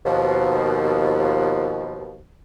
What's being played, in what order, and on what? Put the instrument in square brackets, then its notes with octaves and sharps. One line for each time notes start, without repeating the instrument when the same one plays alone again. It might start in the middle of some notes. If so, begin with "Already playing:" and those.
[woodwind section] D#2 B2 F3